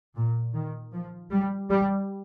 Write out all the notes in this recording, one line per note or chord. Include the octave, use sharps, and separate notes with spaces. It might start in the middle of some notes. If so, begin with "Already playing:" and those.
A#2
D#3
F3
G3
G3